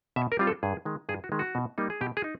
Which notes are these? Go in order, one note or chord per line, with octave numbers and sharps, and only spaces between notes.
B2 E5
A#4
G3 C4 F4
A4
G2 G#4
D#3 G#3
G2 G#4
F#4
D#3 G#3
F#4
B2
G3 A#3 D#4
G#4
B2 G4
G#4
D#4